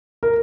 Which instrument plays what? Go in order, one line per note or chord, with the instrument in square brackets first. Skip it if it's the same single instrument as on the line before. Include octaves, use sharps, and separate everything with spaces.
[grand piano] A#4